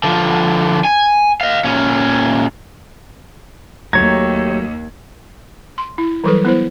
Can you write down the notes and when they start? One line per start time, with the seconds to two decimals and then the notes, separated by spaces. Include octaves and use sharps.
0.04 D3 F3
0.85 G#5
1.41 D#5 F5
1.64 A#2 C#4
3.93 D#2 F#3 A3 G4 C#5 A#5 G#6
5.78 C6
5.98 E4
6.24 E3 F#3 G3 A4 B4
6.45 B3 E4 C5